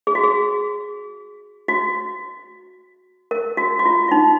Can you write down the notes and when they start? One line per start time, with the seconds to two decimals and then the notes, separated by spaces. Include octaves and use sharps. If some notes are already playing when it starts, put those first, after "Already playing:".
0.07 G#4
0.15 F#4
0.24 G#4
1.68 F#4
3.31 A#4
3.57 F#4
3.79 F#4
3.86 F4
4.08 F4
4.11 D#4